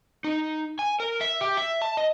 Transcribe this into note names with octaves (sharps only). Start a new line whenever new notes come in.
D#4
G#5
A#4
E5
G4
E5
A5
D#5